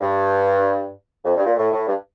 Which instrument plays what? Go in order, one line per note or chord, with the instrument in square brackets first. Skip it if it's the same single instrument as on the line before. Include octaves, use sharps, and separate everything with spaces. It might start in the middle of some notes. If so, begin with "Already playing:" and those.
[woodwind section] G2
F2
G2
A#2
A2
A2
G2